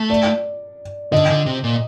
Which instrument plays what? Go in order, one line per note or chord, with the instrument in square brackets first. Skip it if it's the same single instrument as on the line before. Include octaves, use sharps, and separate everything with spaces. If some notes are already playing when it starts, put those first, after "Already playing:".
Already playing: [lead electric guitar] A3
[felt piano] D5
[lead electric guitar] D3 [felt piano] D#5
[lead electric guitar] D3
C3
A#2